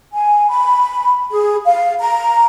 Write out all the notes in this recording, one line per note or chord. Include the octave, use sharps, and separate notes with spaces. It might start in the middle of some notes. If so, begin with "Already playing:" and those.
G#5
B5
G#4
F5
A#5